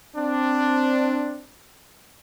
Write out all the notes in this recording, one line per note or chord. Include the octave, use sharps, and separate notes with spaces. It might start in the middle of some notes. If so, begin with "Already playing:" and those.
C4 D4